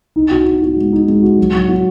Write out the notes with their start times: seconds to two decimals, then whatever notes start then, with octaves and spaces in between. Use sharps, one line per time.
0.16 D#4
0.31 F#4
0.46 D#4
0.62 F#4
0.77 G#3
0.92 D#4
1.08 G#3
1.23 F#4
1.39 F#3
1.54 F#3
1.69 F#4